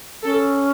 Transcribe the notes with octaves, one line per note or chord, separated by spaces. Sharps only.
C#4 A4